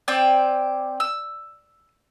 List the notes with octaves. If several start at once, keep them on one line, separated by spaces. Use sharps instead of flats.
C4 D5 G5 G#5
E6